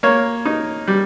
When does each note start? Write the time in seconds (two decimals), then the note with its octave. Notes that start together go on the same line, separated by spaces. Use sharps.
0.03 A#3 C#5
0.45 D#4
0.87 G3